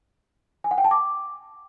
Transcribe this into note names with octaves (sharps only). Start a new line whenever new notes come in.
G#5
F#5
G5
A5
D6